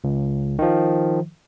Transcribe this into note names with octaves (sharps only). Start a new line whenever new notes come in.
C#2
D#3 F3